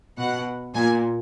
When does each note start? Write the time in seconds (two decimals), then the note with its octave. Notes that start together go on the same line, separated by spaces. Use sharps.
0.18 B2 F#5
0.74 A#2 G#5